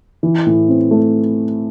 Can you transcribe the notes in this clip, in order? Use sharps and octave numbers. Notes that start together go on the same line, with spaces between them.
E3
A2
C4
A3